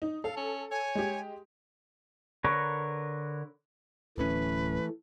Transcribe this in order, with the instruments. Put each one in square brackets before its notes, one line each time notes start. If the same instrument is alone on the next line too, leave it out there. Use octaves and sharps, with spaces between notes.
[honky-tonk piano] D#4
[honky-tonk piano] A4 [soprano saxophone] F5
[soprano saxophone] C#4
[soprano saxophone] C#5 [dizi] G#5
[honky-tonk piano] G#3 G4
[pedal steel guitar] D3 A#4 B4 C#5
[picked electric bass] D1 A2 C#4 [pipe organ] E3 A3 [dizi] B4